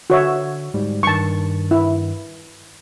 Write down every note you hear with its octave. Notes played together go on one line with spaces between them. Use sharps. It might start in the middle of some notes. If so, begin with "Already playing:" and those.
D3 F#4 C#5 E5
G#2 G3
G2 D#3 A5 C#6
E4